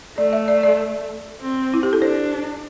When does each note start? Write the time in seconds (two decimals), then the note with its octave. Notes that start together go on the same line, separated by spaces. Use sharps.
0.18 A3 D5
0.33 E5
0.48 D5
0.63 D5
1.41 C4
1.74 E4
1.83 G4
1.93 A4
2.01 D4 C5